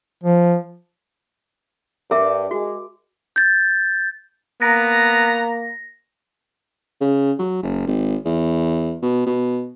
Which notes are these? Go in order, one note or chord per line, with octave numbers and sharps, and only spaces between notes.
F3
G2 A#4 E5 D6
G#3 F#4
G6 A6
A#3 B3 A#5 A#6
C#3
F#3
F#1
G#1
E2
B2
B2